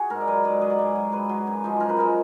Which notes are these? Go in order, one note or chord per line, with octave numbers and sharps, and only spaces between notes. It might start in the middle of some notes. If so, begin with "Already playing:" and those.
Already playing: F#4 G#4
G#2 A#4
D5
F#3 B4
G#2 D5
F#3 D#5
D5
G#2
F#3
G#2 B4
F#3
F#2
F3 G#3
F#2 A#4
B4
F3 G#3 A#4